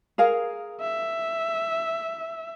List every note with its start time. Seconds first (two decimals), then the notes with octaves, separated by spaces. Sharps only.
0.18 G#4 A#4 F5
0.81 E5